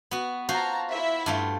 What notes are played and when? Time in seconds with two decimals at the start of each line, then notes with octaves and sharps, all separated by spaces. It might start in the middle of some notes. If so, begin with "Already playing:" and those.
0.11 B3 F#4
0.49 F4 F#4 C5 A5 A#5
0.90 E4 E5
1.26 G2 A3 F4